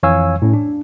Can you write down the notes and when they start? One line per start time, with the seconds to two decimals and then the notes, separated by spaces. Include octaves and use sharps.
0.03 F2 E3 C#5 F5 G#5 E6
0.42 A2 C#4
0.54 D4